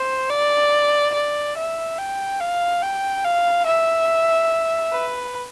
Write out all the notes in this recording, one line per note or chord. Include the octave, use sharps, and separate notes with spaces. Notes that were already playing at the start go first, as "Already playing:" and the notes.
Already playing: C5
D5
D5
E5
G5
F5
G5
F5
E5
B4